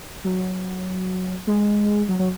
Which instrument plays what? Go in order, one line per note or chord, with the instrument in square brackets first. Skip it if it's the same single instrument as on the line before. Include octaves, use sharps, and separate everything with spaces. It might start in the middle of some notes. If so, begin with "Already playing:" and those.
[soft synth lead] F#3
G#3
F#3
F#3